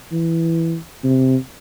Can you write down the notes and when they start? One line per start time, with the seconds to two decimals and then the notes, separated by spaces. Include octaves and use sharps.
0.12 E3
1.04 C3